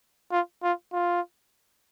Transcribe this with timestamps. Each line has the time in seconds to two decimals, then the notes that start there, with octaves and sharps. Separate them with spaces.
0.31 F4
0.63 F4
0.93 F4